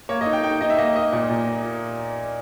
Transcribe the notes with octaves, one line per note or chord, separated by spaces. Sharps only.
A#3 C#5
D#5
D#4
G5
D#4 G5
D#4 D#5
E5
A#3 D#5
A#3 D#5
A#2
A#2